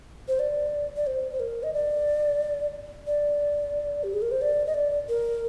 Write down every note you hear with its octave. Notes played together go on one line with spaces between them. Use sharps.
C5
D5
D5
C5
C5
A#4
D#5
D5
D5
G4
G#4
A#4
C5
D5
D#5
D5
A#4